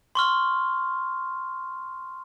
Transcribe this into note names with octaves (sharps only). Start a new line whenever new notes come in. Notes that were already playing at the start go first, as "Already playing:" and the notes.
C6 C#6 F6